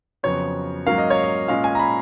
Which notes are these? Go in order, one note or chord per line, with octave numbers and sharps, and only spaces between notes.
F2 C#3 F#3 B3 C#5
G#2 F#3 A#3 C#4 F5
D#5
C#5
D#5
A#2 G#3 C#4 F5
G#5
A#5
B5